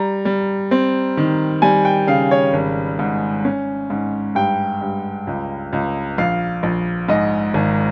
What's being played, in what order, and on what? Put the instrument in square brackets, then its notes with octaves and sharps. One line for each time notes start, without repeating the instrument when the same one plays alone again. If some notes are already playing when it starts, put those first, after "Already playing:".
Already playing: [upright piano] G3 A#5
G3
C4
D#3
G3 G#5
G5
C#3 F5
C#5
G#1
G#2
C#4
G#2
G2 G5
G2
C#2
C#2
A#1 F5
A#1
G#2 D#5
G#1